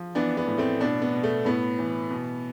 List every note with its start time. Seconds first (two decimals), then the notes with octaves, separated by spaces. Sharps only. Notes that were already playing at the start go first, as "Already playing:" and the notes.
Already playing: F3
0.15 E3 B3 D4
0.37 B3
0.47 A2
0.58 A3 C4
0.80 B2 B3 D4
1.02 B3
1.13 B2
1.23 A3
1.45 A2 B3
1.79 E3
2.11 B2